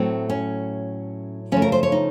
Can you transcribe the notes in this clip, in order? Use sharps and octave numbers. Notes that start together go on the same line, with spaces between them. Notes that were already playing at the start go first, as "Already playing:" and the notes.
Already playing: A2 F#3 A3 C4
C#4
C#3 F3 A3 C#4
A#4
C5
C#5
D#4